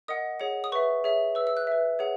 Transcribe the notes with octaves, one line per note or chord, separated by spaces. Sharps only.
A#4 D#5 F#5 D#6
G#4 C#5 F#5
D#6
B4 E5 C#6
G#4 C#5 E5
B4 E6
E5
E6
F#6
B4 E5
G#4 C#5 F#5